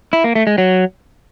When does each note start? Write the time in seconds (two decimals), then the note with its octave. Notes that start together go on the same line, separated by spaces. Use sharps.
0.13 E4
0.24 A#3
0.35 A3
0.47 G#3
0.58 F#3